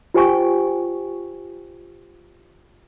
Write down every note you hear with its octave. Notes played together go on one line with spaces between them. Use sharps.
F4 G4 C5 G5 G#5 C#6